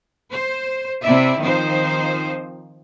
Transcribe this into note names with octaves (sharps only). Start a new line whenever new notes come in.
C5
C3 C4 E4 D5 E5
D#3 F3 C4 D#4 C5